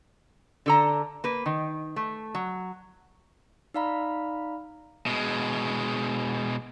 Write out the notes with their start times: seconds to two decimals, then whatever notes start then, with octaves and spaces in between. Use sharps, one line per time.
0.66 D3 A4 A#5
1.24 A#3 B4
1.46 D#3
1.96 A3
2.35 F#3
3.74 D#4 D5 F5 A#5 B5
5.07 B2 G#3